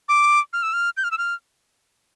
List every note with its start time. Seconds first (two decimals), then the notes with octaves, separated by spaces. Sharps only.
0.09 D6
0.53 F6
0.63 E6
0.73 F6
0.97 G6
1.04 F6
1.11 E6
1.18 F6